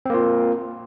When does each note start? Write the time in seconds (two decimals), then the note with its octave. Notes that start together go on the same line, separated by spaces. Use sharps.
0.06 C4
0.10 A#3
0.14 F4